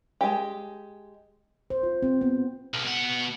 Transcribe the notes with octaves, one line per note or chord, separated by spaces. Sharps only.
G#3 G4
C5
F4
C4
B3
B1
B2 F#5